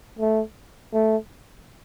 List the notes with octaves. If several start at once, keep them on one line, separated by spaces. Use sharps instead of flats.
A3
A3